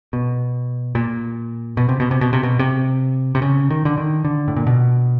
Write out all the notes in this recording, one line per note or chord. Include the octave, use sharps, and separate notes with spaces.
B2
A#2
B2
C3
B2
C3
B2
C3
B2
C3
C3
C#3
D#3
D3
D#3
D3
A2
A#2
B2